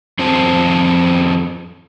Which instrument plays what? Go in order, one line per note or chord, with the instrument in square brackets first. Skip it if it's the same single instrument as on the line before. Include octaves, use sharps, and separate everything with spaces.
[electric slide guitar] F2 F3 C4 G#4 C5 A5